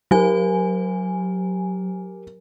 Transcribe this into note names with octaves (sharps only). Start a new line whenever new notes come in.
F#3 G4 A#4 G#5